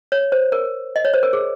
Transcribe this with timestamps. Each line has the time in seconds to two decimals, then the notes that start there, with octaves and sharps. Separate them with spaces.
0.12 C#5
0.32 C5
0.52 A#4
0.96 D#5
1.05 C#5
1.14 C5
1.23 A#4
1.33 G#4